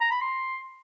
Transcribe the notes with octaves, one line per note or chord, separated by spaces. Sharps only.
A#5
B5
C6